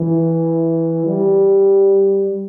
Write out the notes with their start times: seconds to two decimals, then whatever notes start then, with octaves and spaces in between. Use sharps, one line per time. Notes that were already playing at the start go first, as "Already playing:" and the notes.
Already playing: E3
1.07 G3